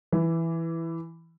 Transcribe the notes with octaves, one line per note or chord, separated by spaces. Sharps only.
E3